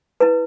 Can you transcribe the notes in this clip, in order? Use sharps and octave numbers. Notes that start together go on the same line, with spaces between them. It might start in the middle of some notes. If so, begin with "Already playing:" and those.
E4 B4